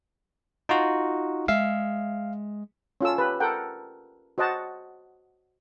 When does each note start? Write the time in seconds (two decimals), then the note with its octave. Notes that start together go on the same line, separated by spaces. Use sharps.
0.69 D#4 F4 F#4
1.48 G#3 E5 F5
3.01 C#4 F4 A4 E6
3.18 G4 B4
3.40 A4 A#4 F#5 G5
4.38 F#4 C5 D#5 F#5 A5